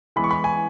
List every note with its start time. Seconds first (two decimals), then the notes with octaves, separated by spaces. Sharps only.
0.16 E3 G#3 B3 B5
0.24 C#6
0.31 B5
0.44 G#5